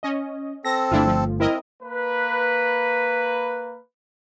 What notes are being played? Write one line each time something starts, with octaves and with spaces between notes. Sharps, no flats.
C#4 D#5
C4 A4 A#6
G1 A3 D4 E4 F4
F3
C4 E4 A#4 D#5
A#3 B4